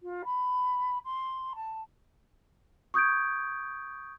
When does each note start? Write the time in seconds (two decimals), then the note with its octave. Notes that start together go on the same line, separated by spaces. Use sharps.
0.02 F4
0.25 B5
1.04 C6
1.55 A5
2.94 C#6 D#6 G6 G#6 D7